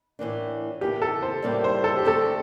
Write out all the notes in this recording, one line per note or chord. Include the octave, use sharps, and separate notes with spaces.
A2 E3 A#3 D4
A2 E3 A#3 G4
A4
C5
A2 G3 A#3 D4
C5
A4
G4
D3 A3 C4 A4